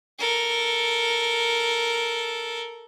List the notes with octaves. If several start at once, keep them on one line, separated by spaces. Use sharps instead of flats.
A4 A#4